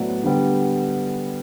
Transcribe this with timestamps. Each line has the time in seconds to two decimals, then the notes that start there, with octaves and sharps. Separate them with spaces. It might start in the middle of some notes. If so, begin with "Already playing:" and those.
Already playing: A2 F#3 B3 D5 F#5
0.23 D3 G3 B3